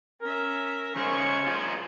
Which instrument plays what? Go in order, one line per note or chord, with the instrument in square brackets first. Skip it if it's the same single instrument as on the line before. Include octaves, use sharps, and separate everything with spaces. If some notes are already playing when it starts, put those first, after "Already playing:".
[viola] C#4 E5 [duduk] A#4
[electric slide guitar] C#3 G#4 C5 [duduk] C#4 [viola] C#6
[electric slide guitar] F4 G#4 C5